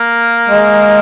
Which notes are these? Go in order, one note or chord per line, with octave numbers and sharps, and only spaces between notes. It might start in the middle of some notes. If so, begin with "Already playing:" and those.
Already playing: A#3
G#3